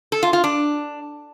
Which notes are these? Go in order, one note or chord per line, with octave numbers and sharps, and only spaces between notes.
A4
F4
F4
D4